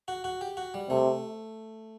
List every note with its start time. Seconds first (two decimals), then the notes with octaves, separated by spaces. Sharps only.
0.08 F#4
0.24 F#4
0.41 G4
0.57 F#4
0.74 G3
0.89 C3 A3